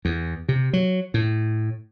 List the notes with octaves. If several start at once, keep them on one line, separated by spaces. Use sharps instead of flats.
E2
C3
F#3
A2